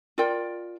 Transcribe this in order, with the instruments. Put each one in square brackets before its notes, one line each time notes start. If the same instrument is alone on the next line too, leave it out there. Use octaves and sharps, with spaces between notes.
[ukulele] F4 A#4 D5 G5